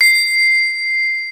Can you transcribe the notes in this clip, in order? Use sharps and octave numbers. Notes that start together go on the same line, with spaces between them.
C7